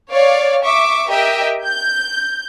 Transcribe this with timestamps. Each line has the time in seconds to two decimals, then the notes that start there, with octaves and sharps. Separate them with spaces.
0.10 C#5 D5 F5
0.64 E5 C#6 D6
1.09 G4 A#4 D#5 E5 G5
1.63 G6